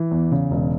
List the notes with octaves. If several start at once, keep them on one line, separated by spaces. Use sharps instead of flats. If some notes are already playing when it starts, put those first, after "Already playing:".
Already playing: E3
E2
C#3
E1